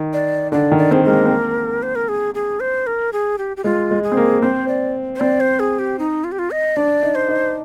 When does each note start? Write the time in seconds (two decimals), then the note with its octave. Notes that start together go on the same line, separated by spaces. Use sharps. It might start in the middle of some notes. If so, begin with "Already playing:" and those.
Already playing: D#3
0.13 D5
0.52 D3 D5
0.72 D#3
0.78 D5
0.91 C4 G#4
1.04 G#3 A#4
1.11 A#3
1.25 C4
1.30 A#3
1.83 C5
1.95 A#4
2.09 G#4
2.35 G#4
2.60 C5
2.87 A#4
3.13 G#4
3.38 G4
3.57 G4
3.64 G#3 F4
3.91 G#3
4.03 G#4
4.12 C4
4.17 A#3
4.42 C4 C5
4.68 D5
5.16 C5
5.20 C4 D5
5.40 C5
5.60 G#4
5.79 G4
5.99 D#4
6.24 F4
6.32 G4
6.39 F4
6.51 D#5
6.77 D4 D5
7.03 D#4
7.15 C5
7.29 D#4